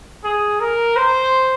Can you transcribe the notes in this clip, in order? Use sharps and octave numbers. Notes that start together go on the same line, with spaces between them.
G#4
A#4
C5